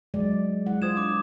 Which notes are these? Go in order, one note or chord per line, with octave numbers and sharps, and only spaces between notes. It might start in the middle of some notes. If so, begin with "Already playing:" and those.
F#3 G#3 D5
G#3 E4 F#5
F4 C5 D#6 G#6 E7
D4 D6